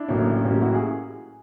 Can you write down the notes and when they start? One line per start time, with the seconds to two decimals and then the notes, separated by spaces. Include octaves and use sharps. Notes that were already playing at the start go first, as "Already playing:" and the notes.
Already playing: D4 E4
0.08 A1 A2 F#3 A#3 C#4
0.44 A1 A2 F#3 A#3 C#4
0.51 G4
0.62 E4 F#4
0.74 G#4